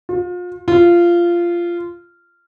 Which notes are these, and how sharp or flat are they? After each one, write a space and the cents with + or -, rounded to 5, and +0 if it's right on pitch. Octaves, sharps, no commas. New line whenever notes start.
F4 +35
F4 -15